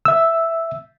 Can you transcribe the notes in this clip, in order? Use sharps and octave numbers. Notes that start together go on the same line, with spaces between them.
E5 E6